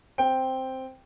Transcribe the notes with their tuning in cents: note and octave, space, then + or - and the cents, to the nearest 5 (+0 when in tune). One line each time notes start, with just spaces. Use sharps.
C4 +0 G5 +0